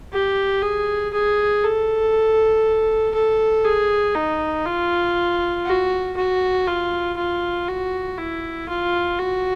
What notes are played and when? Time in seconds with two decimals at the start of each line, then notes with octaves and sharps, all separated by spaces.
0.13 G4
0.63 G#4
1.13 G#4
1.64 A4
3.15 A4
3.65 G#4
4.15 D#4
4.66 F4
5.66 F#4
6.17 F#4
6.67 F4
7.17 F4
7.68 F#4
8.18 E4
8.68 F4
9.19 F#4